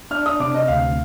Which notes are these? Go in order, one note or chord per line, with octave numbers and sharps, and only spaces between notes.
D4 F6
D#6
C3 D6
D#5
D2 F5